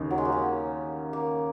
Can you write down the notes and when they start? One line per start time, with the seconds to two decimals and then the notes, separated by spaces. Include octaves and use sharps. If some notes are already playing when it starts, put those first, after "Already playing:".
Already playing: D#2 C#3 D#4
0.11 F#3
0.18 G#3
0.25 A#3
0.32 C#4
1.13 A#3